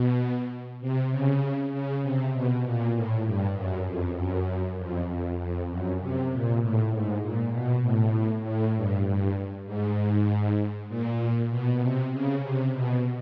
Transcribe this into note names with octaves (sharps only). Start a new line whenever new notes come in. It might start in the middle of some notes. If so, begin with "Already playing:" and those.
Already playing: B2
C3
C#3
C#3
C3
B2
A#2
A2
G2
F#2
F2
F#2
F2
F2
F2
F#2
C3
A#2
A2
G#2
A#2
B2
A2
A2
G2
G2
G#2
A#2
B2
C3
C#3
C3
B2